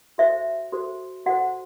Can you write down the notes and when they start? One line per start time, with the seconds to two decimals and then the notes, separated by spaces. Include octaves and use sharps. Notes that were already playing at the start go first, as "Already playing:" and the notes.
0.18 F#4 A4 C5 E5
0.72 F#4 A4 C5
1.26 F#4 A4 C5 F#5